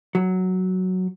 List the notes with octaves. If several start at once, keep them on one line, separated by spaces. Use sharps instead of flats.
F#3